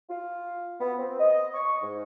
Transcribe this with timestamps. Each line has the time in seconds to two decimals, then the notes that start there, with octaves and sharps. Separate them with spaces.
0.10 F4
0.79 B3
0.98 C4
1.19 D#5
1.54 C#6
1.82 G#2